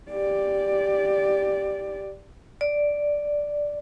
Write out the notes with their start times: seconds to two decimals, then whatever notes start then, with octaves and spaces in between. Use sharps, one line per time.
0.11 G4 D5
2.61 D5